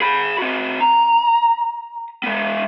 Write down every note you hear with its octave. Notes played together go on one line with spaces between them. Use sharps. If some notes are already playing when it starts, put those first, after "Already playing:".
G#4 B5
C4 F#4
A#5
G#3 B3